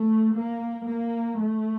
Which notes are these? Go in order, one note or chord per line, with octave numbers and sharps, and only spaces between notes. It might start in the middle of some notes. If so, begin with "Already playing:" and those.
Already playing: A3
A#3
A#3
A3